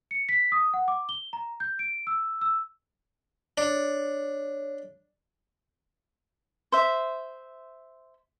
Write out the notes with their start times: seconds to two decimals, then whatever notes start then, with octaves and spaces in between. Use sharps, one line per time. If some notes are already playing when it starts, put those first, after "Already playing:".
0.11 C#7
0.29 B6
0.52 D#6
0.74 F#5
0.88 D6
1.09 G7
1.33 A#5
1.60 G6
1.79 D7
2.07 E6
2.41 E6
3.58 D4 C#5
6.72 C5 E5